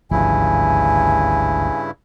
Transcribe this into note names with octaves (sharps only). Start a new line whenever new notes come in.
G#1 D2 G2 C#3 F3 E4 G#5